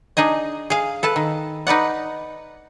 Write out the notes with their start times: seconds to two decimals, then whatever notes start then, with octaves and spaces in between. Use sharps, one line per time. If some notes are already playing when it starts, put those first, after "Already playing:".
0.17 D4 D#4 G#4 D#5
0.70 G#4 F5
1.03 A4 B4 A5
1.16 D#3
1.67 D#4 B4 D5 F#5